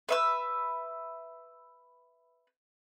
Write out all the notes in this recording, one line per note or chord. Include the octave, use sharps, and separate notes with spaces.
B4 E5 E6